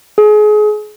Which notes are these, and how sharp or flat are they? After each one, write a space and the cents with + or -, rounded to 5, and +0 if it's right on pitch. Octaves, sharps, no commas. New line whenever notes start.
G#4 +30